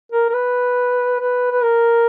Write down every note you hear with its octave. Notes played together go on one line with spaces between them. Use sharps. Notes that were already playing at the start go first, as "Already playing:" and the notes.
A#4
A#4
B4
B4
B4
A#4